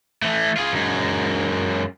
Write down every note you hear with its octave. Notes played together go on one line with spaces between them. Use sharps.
E3 A3
F4 G#4
F#2 G#3